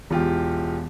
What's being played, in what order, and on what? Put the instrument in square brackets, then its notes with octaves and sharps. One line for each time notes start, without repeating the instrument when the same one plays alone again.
[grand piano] E1 F4 G4